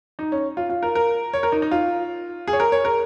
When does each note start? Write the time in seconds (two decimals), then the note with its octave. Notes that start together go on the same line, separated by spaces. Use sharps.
0.19 D#4
0.32 C#4
0.57 F4
0.70 F4
0.83 A#4
0.95 A#4
1.33 C#5
1.43 A#4
1.52 D#4
1.62 D#4
1.72 F4
2.47 G#4
2.53 C#5
2.60 A#4
2.72 C#5
2.85 A#4